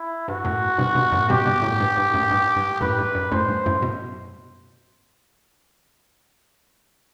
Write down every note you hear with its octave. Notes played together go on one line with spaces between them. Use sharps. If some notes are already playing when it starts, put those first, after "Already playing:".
Already playing: E4
G2 F#4
F#2 A2
G2 B2
G2 B2
F#2 A2
G2 B2 G4
G2 B2
F#2 A2
G2
G2
F#2 A2
G2
G2
F#2 A2 B4
G2
F#2
F#2 A2 C5
G2
F#2 A2
B2